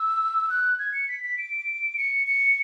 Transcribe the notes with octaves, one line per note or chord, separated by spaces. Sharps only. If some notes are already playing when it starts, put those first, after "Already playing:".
Already playing: E6
F#6
G#6
C#7
B6
B6
D7
C#7
C#7